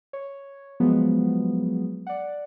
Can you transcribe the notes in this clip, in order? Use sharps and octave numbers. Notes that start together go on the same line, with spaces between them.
C#5
F3 F#3 G#3 B3
D5 F#5